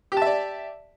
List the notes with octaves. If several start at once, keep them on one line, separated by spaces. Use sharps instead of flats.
G4 D5 E5 A5